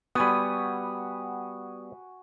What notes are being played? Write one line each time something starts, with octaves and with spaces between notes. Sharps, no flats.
G3 B3 F#4 G#5 B5 D#6